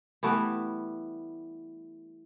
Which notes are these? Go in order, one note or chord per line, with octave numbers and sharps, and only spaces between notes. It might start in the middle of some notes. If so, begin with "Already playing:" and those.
E3 G3 A3 B3